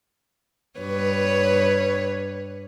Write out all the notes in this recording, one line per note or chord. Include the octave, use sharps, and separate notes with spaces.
G2 B4 C#5